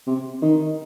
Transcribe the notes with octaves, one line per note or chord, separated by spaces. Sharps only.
C3
D#3